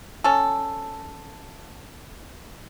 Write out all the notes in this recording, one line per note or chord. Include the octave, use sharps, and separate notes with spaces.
C#4 A4